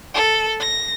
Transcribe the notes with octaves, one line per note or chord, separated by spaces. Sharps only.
A4
A#6